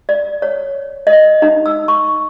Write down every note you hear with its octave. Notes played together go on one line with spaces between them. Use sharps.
D5
C#5
D#5
D#4
E6
C#6